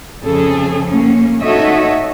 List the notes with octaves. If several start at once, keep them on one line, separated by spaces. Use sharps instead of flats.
F2 C#3 G#4 A4
A#3 C#4
D#4 F#4 A4 C#5 D#5 E5